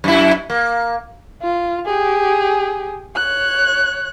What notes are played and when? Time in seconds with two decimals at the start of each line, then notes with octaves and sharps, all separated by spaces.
0.04 F#2 E4
0.50 A#3
1.42 F4
1.86 G4 G#4
3.16 C#5 F#6